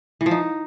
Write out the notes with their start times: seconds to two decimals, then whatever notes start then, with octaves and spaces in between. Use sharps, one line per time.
0.21 E3
0.26 F3
0.31 D#4